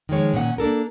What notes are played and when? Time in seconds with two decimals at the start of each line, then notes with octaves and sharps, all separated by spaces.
0.09 D#3 F3 G#3 C#5
0.34 A#2 D#3 C#4 F#5
0.58 A#3 D4 A4 A#4